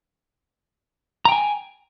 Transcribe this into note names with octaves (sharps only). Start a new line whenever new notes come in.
G5 G#5 A#5